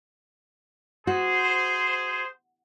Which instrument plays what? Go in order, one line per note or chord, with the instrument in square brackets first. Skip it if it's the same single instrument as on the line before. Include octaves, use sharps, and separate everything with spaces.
[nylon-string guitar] F#4 [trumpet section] G#4 C5